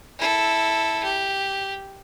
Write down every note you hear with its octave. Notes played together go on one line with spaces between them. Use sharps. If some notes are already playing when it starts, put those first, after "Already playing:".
E4 A4
G4